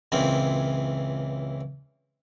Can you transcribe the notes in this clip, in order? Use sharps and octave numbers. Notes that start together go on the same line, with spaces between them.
C#2 A#2 E3 C4 C#4